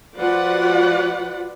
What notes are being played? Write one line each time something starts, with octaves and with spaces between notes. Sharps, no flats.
F3 F4 F#4 B4 D5 F#5